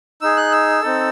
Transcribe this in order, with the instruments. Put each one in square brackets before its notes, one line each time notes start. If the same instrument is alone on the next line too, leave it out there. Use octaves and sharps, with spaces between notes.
[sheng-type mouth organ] D#4 G#4 E6
F#6
E6
C4 D#4 A4